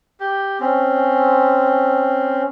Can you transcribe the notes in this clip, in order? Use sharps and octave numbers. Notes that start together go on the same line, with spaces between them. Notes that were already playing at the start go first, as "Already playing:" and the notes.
G4
C4 C#4